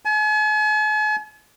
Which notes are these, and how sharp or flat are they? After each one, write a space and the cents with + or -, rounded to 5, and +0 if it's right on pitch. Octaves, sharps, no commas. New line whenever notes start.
G#5 +45